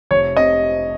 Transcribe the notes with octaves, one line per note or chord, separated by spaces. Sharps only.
F1 C#5
C3 D#5